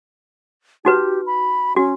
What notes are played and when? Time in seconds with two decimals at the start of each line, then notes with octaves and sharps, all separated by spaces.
0.85 D#4 F#4 G4 B4
1.26 B5
1.77 C#4 F#4